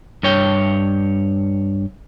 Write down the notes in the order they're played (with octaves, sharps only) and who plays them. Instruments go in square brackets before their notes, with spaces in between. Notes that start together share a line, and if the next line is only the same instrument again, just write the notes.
[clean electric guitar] G2 C#5 G5